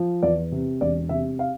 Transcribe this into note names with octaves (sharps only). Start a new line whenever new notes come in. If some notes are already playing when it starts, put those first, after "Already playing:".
Already playing: F3
E2 D5
C3
E1 D5
C3 E5
F5